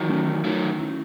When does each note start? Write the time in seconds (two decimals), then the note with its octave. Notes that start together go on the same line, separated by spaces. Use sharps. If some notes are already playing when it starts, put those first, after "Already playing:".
Already playing: D#3 E3 F#3
0.09 A3 C#4 E4
0.44 D#3 F#3 A3
0.79 C#4 E4